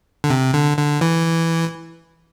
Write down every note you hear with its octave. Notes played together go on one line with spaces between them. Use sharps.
D3
C3
D3
D3
E3